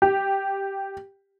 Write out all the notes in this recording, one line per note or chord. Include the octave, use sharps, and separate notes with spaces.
G4